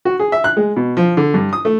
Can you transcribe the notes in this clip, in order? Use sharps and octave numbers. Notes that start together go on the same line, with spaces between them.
F#4
G#4
E5
F#6
G#3
B2
F3
D3
G2
D#6
A3